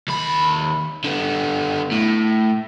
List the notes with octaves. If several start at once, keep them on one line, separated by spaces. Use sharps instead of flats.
D#2 B5
D3 B3
A2